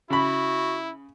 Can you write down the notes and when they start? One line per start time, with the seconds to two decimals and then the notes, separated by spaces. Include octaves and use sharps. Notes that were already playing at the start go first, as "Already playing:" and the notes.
0.10 C#3 E4 F#4 B5